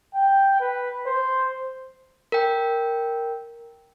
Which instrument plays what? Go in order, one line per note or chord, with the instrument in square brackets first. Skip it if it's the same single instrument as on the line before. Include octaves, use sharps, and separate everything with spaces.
[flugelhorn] G5
B4
C5
[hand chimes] A#4 G5